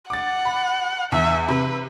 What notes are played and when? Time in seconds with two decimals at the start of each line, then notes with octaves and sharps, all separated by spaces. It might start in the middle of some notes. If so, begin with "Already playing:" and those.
0.10 F#5 D6 A6
0.45 B5
1.12 E2 E5
1.48 C3 B4